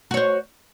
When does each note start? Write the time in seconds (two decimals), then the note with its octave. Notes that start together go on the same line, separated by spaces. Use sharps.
0.11 F#4
0.14 C#5
0.17 C5